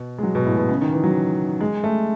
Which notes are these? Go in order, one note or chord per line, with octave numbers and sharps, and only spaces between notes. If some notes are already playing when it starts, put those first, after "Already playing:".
Already playing: B2
G#3
F#3
B2
A2
B2
C#3
D#3
E3
F#3
G#3
A3